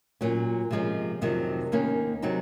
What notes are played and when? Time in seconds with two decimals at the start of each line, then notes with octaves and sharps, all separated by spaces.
0.21 A#2 F#3 C#4
0.71 C3 F3 G#3 C#4
1.21 F2 C3 D#3 F#3
1.72 D#2 D#3 A#3 C#4
2.22 C3 F#3 C4 D#4